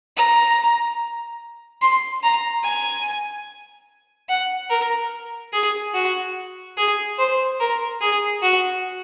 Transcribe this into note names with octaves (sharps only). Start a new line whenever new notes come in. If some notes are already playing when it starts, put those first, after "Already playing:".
A#5
C6
A#5
G#5
F#5
A#4
G#4
F#4
G#4
C5
A#4
G#4
F#4